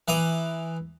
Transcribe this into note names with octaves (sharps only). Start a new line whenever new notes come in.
E3 A#5 D6 D#6